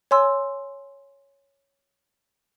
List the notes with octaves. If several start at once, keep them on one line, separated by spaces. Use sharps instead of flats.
C#5 G#5 C6 E6